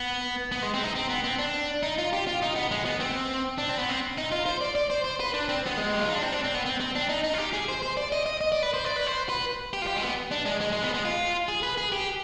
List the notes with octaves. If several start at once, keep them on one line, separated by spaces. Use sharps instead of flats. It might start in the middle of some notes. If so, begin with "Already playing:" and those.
Already playing: B3
B3
G#3
C4
D#4
C4
B3
C4
D4
D#4
F4
G4
F4
D#4
B3
G#3
B3
C4
D4
C4
B3
C4
D#4
F4
C5
D5
D5
C5
C5
B4
D4
C4
B3
G#3
G4
F4
D#4
D4
C4
D4
C4
B3
C4
C4
D4
D#4
D#4
F4
G4
G#4
C5
C5
D5
D#5
D#5
D#5
D5
B4
C5
D5
B4
C5
B4
G4
F4
G4
G#3
B3
D4
G#3
G#3
G#3
B3
G#3
F4
G#4
B4
G#4
G4